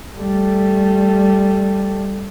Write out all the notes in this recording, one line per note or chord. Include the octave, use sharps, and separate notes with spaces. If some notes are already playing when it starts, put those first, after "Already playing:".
G3 A3